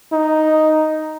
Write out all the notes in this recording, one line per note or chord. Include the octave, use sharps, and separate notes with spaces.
D#4